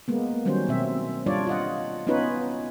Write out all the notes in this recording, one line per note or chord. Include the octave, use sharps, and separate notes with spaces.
G#3 A#3 B3
D#3 F#3 G3 C#4 C5
B2 C4 E5
G3 D4 F4 C#5 D5
F4 D#5 F#5
B3 C#4 D#4 F4 B4 C#5